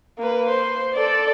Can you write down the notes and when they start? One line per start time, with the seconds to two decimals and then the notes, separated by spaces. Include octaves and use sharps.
0.18 A#3 B4
0.49 C5
0.94 A4 D5